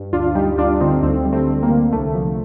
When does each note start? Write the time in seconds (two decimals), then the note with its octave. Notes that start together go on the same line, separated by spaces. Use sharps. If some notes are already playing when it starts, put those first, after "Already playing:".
Already playing: G2
0.13 D2 D4 F4
0.35 G3 D#4 G4
0.58 D2 D4 F4
0.80 D3 C4 D#4
1.03 D2 A3 C4
1.25 G3
1.33 A3 C4
1.48 D2
1.63 A#3
1.71 D3
1.93 C2 A3
2.15 F3